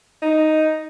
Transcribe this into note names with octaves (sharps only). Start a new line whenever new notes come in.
D#4